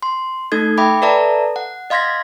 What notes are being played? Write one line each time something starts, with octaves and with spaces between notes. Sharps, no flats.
C6
A3 D#4 A4 G#6
E5 G5 B5 D6
A4 B4 D5 E5 A5 A#5
F#5
D#5 F5 C6 G#6 A#6 B6